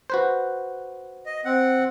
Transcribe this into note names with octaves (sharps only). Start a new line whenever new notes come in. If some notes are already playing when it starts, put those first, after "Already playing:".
F#4 B4 C5
D#5
C4 F#5